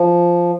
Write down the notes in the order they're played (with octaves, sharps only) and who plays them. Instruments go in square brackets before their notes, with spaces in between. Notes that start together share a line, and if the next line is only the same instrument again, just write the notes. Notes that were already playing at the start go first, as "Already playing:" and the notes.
Already playing: [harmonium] F3